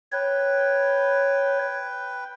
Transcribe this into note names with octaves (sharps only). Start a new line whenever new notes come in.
B4 C#5 G5